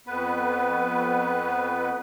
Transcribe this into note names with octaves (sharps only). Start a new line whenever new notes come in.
F2 B3 B4